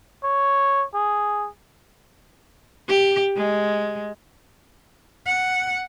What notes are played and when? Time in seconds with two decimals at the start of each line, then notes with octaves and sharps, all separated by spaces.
0.23 C#5
0.94 G#4
2.89 G4
3.36 G#3
5.26 F#5